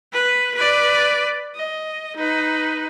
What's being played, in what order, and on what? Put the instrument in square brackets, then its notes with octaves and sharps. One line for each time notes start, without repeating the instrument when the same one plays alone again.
[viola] B4
B4 D5
D#5
D#4 B4